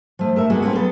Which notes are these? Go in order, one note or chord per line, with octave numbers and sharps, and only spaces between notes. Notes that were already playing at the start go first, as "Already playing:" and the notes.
F3 A3
A3 A#4 E5
G#3 A#3 B3 F#4
A3 A#3 C4 C#4 F4 B4
F#3 B3 A4 B4